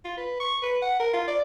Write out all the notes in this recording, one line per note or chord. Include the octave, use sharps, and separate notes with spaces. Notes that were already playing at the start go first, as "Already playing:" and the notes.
F4
B4
C#6
B4
F#5
A#4
F4
D5